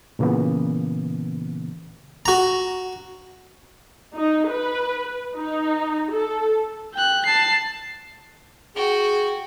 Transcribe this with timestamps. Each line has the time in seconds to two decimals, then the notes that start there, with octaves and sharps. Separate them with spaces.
0.19 A#2 C#3 E3 A#3 B3
2.26 F#4 A#5
4.16 D#4
4.49 B4
5.37 D#4
6.10 A4
6.94 G5 F#6
7.25 A5 C7
8.75 F#4 G#4 G5